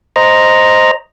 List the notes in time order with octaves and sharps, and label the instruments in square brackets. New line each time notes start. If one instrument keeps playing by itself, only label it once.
[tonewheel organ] C5 D#5 A#5